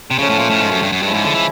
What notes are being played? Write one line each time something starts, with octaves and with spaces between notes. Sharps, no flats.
C3
C#3 F3 A3 C#4
A2
A#2
A2
G#2
F#2
G2
F#2
G2 F3 G#3 C#4 E4
G#2
D3
E3